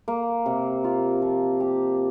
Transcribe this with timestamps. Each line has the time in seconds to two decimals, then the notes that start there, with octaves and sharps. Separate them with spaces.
0.08 A#3
0.46 C3
0.84 F4
1.22 F3
1.60 G4